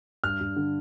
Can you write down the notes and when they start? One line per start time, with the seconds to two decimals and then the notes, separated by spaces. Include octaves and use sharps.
0.24 G2 F6
0.40 G2
0.56 D3